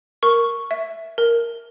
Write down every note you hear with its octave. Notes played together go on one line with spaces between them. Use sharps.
A#4 C#6
E5
A#4